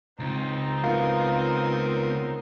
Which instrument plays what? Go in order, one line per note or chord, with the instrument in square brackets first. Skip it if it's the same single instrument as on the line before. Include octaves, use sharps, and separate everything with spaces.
[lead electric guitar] C#2 [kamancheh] C4 D#4
[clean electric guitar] B3 F4 [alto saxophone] A#4